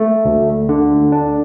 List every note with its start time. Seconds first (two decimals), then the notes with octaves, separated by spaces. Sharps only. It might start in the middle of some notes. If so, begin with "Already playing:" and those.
Already playing: A3
0.25 D2
0.69 D3
1.12 D4